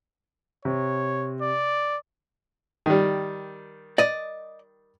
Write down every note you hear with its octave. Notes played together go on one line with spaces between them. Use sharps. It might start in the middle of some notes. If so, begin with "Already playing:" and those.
C3 C#5
D5
D#3 G3
D5 D#5